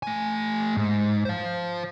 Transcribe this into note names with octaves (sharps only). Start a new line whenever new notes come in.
A3 G#5
G#2
C5 F5